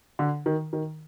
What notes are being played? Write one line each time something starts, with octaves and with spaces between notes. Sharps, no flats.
D3
D#3
D#3